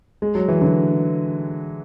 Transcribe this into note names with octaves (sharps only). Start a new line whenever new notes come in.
G#3
F#3
E3
D3 F#3